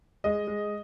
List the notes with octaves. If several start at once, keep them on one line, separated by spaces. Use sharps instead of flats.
G#3 D#5
G#3